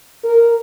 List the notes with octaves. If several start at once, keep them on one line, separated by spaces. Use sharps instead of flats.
A#4